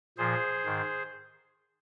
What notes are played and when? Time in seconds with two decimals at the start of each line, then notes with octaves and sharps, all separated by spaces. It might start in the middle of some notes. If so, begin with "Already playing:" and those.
0.18 A#2 F3 G#4 C5
0.65 G#2 D#3